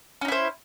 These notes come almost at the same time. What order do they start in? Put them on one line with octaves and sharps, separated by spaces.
C#4 D#4 E4 C5